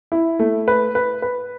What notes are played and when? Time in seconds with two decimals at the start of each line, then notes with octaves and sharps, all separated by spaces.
0.12 E4
0.39 A3
0.68 B4
0.95 B4
1.22 B4